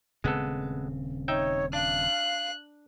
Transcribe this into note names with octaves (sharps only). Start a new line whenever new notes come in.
D#1 C#3 G#3 B3 C4 A4
D#4 C#5 E5 G5
D4 F5 F#6